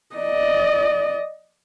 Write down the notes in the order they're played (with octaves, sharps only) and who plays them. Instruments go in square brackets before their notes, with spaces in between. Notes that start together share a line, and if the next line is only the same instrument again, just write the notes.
[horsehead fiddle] D5 D#5